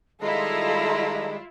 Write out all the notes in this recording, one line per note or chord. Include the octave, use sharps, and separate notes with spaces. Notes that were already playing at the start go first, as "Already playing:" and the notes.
D#3 G3 G#3 E4 F4 A4 D#5 A#5